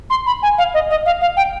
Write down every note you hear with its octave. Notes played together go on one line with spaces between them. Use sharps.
C6
B5
G#5
F5
D#5
D#5
F5
F5
G5